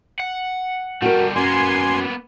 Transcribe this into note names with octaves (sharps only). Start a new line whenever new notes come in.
F#5
G3 A3 F#4 A#4
F#2 A#3 B3 G#5 C6